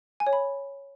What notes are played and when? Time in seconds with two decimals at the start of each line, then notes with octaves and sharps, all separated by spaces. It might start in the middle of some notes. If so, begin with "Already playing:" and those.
0.20 G#5
0.27 C#5
0.33 B5